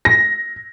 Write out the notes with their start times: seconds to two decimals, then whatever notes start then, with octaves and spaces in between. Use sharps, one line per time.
0.05 A#6